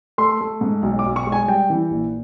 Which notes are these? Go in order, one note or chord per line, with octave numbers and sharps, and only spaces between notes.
A3 C6
A3
G#2
B1
D6
B1
C#6
G#3
G#5
G3 G5
E3
A#1